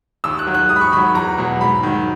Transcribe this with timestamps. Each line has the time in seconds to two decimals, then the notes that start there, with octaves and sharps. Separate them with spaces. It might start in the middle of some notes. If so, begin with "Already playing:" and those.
0.24 D#2 E6
0.39 F#6
0.47 D#3 F#3
0.54 F#6
0.69 G#2 D#6
0.76 B5
0.81 C#6
0.92 D#3 B5
0.97 F#3
1.15 E2 A#5
1.38 B2 F#3
1.61 G#2 B5
1.83 D#3 F#3